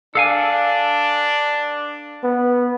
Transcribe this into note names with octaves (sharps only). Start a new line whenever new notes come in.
D4 A4 F5 G#5
B3